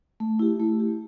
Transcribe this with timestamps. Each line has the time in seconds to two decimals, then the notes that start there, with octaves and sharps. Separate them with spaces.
0.20 A3
0.39 E4 G4
0.60 A3
0.79 E4 G4